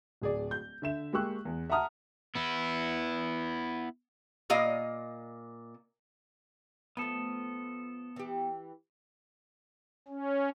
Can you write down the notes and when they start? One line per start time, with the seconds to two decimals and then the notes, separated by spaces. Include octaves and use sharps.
0.22 D1 G#4 D5
0.51 G6
0.82 D3 E5 E7
1.13 G#3 A#3 G4 C#6 E6 F#6
1.45 E2
1.70 E5 F#5 A5 A#5 D#6 F6
2.35 B3 E4
4.50 A#2 A#3 D#5 F5
6.97 F3 A3 B3 A4
8.16 E3 G4
10.08 C#4